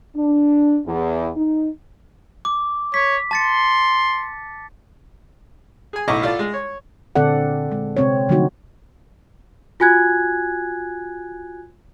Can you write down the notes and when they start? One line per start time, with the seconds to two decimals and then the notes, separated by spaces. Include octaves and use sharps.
0.16 D4
0.85 E2
1.35 D#4
2.45 D6
2.94 C#5 B6
3.31 A5 C6 A6 C#7
5.93 G#4 G#5
6.08 B1 A2 E4 D#5 C#6 D6
6.23 F4 A4 D5
6.39 G#3
6.54 C#5
7.15 A#2 D3 C4 A4 D5 F#5
7.69 D3 G#3
7.97 C3 C4 C#5
8.29 D3 F3 F#3 A3 D#4 F#4
9.80 F4 F#4 G#5 F#6 G#6